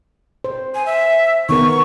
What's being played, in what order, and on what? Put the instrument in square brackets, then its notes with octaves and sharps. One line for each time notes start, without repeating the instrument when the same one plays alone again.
[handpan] C5
[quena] G#5
E5
[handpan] D#3 B3 A#4 [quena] C#6